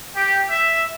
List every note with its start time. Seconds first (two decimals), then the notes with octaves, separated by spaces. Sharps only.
0.16 G4
0.50 E5